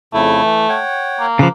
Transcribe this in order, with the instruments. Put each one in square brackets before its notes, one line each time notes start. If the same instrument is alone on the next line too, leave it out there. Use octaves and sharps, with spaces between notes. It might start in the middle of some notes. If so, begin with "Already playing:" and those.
[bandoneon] F2 C#3 E4 [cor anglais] A3
[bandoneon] E3
C#5 F#5 G5
[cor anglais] A#3
[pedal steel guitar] C#3 F3 [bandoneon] B4 D6